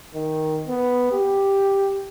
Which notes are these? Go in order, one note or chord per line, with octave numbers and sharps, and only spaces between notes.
D#3
B3
G4